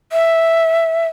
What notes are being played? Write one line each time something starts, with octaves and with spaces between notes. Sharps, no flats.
E5